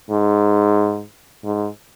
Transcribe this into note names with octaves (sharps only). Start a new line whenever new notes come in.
G#2
G#2